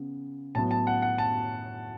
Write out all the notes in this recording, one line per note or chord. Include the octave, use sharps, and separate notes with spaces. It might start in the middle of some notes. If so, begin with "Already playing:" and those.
Already playing: C#3 B3
A2 F#3 B3 A5
A5
F#5
F#5
A5